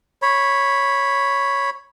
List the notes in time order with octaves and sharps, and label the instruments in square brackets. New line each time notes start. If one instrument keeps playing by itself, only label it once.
[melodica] C#5 B5